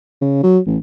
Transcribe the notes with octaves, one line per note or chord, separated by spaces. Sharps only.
C#3
F#3
A1